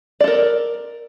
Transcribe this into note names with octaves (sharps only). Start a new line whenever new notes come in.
A4 A#4 D5